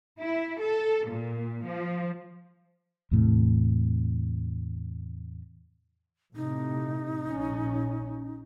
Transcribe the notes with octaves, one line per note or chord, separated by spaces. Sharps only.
E4
A4
A#2
F3
E2 A2 C3
A2 C3 D#4
A#1 C#4